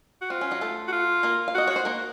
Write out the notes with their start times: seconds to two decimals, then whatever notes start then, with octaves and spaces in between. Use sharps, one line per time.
0.21 F#4
0.30 C4 F4
0.41 C#4
0.51 F#3 F#4
0.61 A3 A4
0.88 F#4
0.92 F4
1.23 A#3 A#4
1.48 F5
1.55 F#4 D#5
1.68 F#4 C#5
1.76 C5
1.85 A#3 A#4